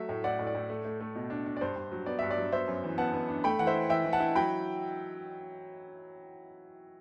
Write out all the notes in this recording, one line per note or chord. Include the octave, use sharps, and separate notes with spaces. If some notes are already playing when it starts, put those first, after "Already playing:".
Already playing: F#3 A3 E5
A2
A2 D5 F#5
A2
D5
A2
A3
A3
A3
B2
D4
D4
D5
G2 C5
G2
F#3
B3 D5
G2 E5
D5
F#3
B3 C5 E5
F#2
E3
B3 F#5 A5
B3
D4
A3 G5 B5
E3 F#5
C5 E5
E4
E3 E5 G5
E3
F#5 A5
E4
F#3 G5 B5